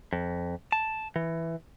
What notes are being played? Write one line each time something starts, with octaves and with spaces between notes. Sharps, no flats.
F2
A5
E3